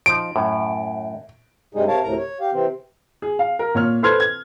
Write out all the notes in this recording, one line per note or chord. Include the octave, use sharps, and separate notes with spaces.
F3 D#4 D7
F#2 A2
G2 C3 G3 G#3 D#4 G#4
C3 A#4 C#5 F5 A5
D2 A2 C3 A#4 A#5
C#5
G4 F5
C3 E3 C4
G#4
F5
A#4
A#2 C#5 F6
A4 B4 C5 C6 F6 G#6
G#6